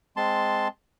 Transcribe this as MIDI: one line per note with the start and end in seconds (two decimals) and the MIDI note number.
0.17 0.68 56
0.17 0.68 60
0.17 0.68 81
0.17 0.68 84